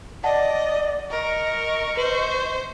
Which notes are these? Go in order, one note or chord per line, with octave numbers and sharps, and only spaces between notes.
D5 D#5 F#5 A5
A#4 D#5 C#6
B4 C5 F#7